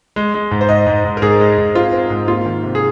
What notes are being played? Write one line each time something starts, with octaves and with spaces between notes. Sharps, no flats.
G#3
G#3
G#2
C5
G#2 D#5
G#2
G#2
A#4
G#2 G#4
G#3
G#2
C4 F4
C4
G#2
A#3 F4
D#3
C3
G#4